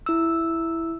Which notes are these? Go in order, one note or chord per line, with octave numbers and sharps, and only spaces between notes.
E4 E6